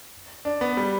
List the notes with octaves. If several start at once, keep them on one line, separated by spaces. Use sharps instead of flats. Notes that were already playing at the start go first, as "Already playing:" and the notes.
D4
B3
G3